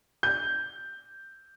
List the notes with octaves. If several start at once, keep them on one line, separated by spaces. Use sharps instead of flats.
G6